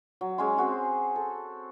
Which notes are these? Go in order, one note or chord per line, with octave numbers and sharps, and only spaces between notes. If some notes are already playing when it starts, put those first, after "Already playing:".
F#3
G#3 C#4 G#5 C6
C4 F#4 G#4
A4